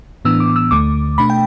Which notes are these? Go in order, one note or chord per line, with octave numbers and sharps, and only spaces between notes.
A2 E3 B3 D4 E6
D6
E6
D2 D3 A3 D6
B2 A3 D4 B5
G5